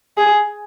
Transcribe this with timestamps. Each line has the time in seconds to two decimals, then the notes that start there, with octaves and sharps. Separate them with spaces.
0.17 G#4